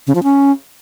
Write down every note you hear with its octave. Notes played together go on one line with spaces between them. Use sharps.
C#3
F3
C#4